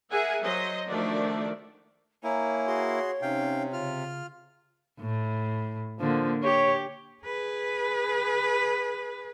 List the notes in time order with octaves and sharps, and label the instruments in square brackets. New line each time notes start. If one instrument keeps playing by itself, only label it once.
[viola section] G#4 A#4 E5 F#5 G#5
F#3 C5 D#5
D#3 F3 A3 D4 F#4 D5
[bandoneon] A#3 E4 [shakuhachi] C#5 [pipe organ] G#5 A#5
[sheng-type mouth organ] F#4 G#4 C6
[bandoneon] C3 [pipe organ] C#4 D#4 [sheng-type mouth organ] F5 G5
[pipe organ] C#3 [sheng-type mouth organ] F4 F6
[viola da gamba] A2
[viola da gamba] D3 A#3 [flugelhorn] F3
[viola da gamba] G4 [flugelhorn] C#5
[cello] G#4 B4